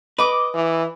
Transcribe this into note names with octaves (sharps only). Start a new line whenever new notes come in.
B4 D#5 D6
E3